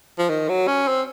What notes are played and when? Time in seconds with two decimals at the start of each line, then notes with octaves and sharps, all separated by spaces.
0.18 F3
0.30 D#3
0.49 F#3
0.67 C#4
0.88 C4